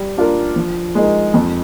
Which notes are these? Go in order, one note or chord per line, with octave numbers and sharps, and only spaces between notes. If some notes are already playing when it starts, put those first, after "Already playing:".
Already playing: G3
D4 F4 A#4
F3
G#3 D#4 A#4
F2